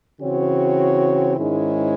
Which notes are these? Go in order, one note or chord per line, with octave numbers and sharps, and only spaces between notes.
C#3 E3 C4 F#4 C#5
G#2 D#3 G#3 C#4 E4